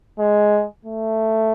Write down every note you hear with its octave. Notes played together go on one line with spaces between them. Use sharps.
G#3
A3